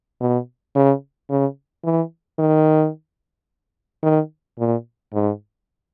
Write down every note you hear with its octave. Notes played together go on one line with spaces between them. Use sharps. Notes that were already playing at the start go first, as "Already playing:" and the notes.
B2
C#3
C#3
E3
D#3
D#3
A#2
G#2